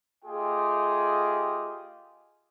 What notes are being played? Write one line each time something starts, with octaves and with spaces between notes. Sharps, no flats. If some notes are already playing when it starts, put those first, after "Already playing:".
A3 F4 G4 G#4 D#5 G5